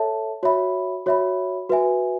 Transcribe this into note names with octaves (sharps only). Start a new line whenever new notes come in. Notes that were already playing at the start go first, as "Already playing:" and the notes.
Already playing: A4 C#5 E5 A5
F#4 C#5 E5 B5
F#4 C#5 E5 B5
F#4 B4 E5 G#5